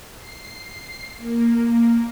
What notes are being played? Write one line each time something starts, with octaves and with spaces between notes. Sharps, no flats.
C7
A#3